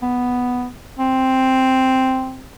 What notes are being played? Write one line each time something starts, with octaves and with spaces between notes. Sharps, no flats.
B3
C4